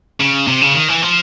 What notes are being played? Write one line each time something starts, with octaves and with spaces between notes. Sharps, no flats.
C#3
C3
C#3
D#3
E3
F3